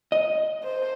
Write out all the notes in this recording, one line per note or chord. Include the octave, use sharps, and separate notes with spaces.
D#5
C5